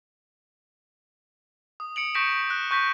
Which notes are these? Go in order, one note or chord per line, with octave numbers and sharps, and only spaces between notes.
D#6
C#7 D7 F#7
C#6 G6 A#6 B6 D7 E7
E7
F#6
C#6 F#6 G6 A#6 B6